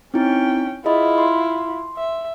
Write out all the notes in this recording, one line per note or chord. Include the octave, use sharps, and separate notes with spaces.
C4 C#4 D#4 E4 G5
E4 F4 G#4 D#5 B5
C6
E5